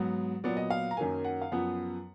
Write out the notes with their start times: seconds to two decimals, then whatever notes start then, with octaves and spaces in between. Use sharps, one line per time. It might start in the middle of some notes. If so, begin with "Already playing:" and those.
Already playing: G#2 F#3 B3
0.44 A#2 F#3 B3 D5
0.57 D#5
0.70 F5
0.91 A#5
0.97 F#2 D#3 F#3 A#3 G#5
1.24 F#5
1.42 F5
1.52 F#2 F3 B3 F#5